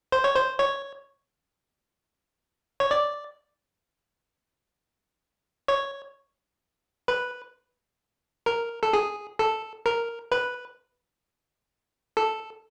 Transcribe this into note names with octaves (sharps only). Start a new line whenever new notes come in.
C5
C#5
C5
C#5
C#5
D5
C#5
B4
A#4
A4
G#4
A4
A#4
B4
A4